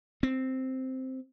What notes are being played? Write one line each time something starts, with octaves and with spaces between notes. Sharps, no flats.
C4